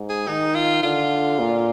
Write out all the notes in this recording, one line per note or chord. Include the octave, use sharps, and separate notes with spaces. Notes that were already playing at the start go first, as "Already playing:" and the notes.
Already playing: G#2
G#4
D#3 D#4
F4
D3 F4
A#2